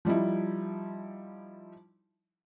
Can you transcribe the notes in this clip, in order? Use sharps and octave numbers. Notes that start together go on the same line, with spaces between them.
F3 G3 D#4 E4